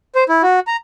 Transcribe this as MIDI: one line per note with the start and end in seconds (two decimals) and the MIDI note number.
0.15 0.24 72
0.29 0.42 64
0.43 0.60 66
0.67 0.76 82